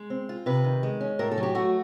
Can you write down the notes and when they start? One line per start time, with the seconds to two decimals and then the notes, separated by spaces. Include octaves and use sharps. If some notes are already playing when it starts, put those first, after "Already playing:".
Already playing: G#3
0.10 C4
0.29 F4
0.46 C3 B4
0.64 D#3
0.83 G#3
1.01 C#4
1.19 A2 A#4
1.31 A4
1.38 F#3
1.43 G4
1.55 A3 F#4